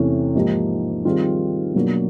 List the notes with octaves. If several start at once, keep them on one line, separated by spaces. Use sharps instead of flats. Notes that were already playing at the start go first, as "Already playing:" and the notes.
Already playing: E2 C3 E3 A3 C#4
G#2 F3 A#3 D#4 G4
D#3 G3 C4 F4 G#4
B2 F#3 A#3 D4